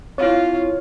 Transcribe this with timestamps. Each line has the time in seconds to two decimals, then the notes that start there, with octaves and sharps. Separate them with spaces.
0.18 C4 E4 F4 C#5 F5